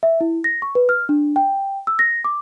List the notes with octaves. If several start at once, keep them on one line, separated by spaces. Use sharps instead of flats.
E5
E4
A#6
C#6
B4
F6
D4
G5
E6
A#6
D6